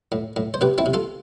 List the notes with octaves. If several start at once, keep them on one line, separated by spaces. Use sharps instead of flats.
A2
A2
C5
C3 G4 B4
C4 E4
C3
F4 A4